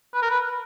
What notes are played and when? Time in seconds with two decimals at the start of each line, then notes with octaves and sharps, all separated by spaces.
0.14 B4
0.22 A#4
0.31 B4